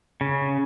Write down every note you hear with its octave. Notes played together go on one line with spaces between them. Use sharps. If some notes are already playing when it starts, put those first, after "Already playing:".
C#3